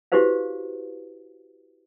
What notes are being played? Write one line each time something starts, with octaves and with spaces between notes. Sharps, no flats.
E4 F#4 G4 B4 C5 F5